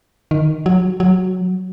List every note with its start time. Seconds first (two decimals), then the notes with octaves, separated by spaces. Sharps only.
0.31 D#3
0.66 F#3
1.00 F#3